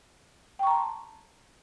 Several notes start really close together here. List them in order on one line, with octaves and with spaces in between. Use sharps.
G5 C#6 A#5 A5 C6